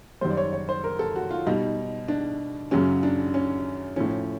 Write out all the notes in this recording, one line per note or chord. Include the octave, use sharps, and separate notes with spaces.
F#2 D#3 G3 C5
D5
C#5
C#5
C5
A#4
A4
F#4
F4
B2 G3 D#4
D4
F#2 C#3 F#3 C#4
D4
C#4
A2 F3 C#4